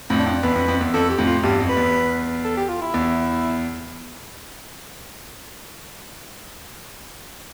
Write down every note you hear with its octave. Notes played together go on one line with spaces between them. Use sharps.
F2 A2
D4
F2
E2 B4
F2
F2
E2
F2 A4
G4
F2 A2
F4
E2 G2 G4
F2
B4
E2
A4
G4
F4
E4
E2